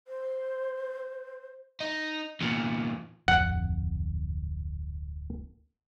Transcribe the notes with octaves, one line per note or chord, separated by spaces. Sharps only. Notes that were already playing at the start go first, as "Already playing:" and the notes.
C5
D#4
E2 A#2
D1 G#1 F2 F#5